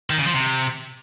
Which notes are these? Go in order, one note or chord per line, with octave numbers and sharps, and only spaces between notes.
D#3
C#3
F3
C3